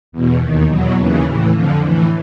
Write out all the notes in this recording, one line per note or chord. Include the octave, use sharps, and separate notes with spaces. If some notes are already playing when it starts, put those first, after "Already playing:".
E2 B2
D#2 D#3
E2 B2 F#3
D#2 C#3 E3
A2 E3
F2 D3 F3
A2 E3